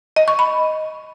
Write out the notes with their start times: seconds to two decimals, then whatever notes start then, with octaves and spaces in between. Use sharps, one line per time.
0.16 D#5
0.28 C#6
0.39 B5